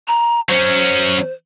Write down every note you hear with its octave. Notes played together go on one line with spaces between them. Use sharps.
A#5
F#3 C#4 C5